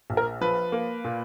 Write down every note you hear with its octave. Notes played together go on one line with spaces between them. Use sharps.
A#1
A#4
F3 B4
A#3
A#2